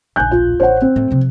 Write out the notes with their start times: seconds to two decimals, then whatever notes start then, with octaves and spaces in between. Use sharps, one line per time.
0.16 D1 A#1 G#5 F#6 G6
0.31 F4
0.60 A1 C5 C#5 F#5
0.82 C4
0.96 A2 A3
1.11 C3 F3